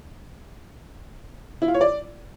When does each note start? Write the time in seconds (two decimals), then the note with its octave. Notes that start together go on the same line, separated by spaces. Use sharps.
1.62 E4
1.68 F4
1.74 C#5
1.81 D5